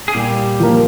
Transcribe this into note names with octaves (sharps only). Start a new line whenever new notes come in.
G#4
A#2 G3 G4
F3 A#3